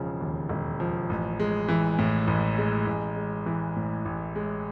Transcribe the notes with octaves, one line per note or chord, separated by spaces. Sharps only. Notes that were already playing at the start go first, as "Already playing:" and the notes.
Already playing: E1 C#3 F3
D#2
E1
F3
A1
G#3
E3
A2
A1
G#3
A1
G#3
E3
A2
A1
G#3